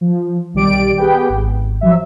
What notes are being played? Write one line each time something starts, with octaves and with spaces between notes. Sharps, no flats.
F3
B1 D#3 G3 G4 D5 D7
B3 G4 G#4 B4 G5
G#1
F3 F#3 E5